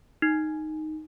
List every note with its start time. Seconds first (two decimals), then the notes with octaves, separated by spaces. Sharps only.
0.22 D#4